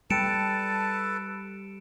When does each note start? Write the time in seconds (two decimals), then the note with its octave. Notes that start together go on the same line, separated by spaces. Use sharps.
0.10 G3 A4 B4 A5 C#7 D7 E7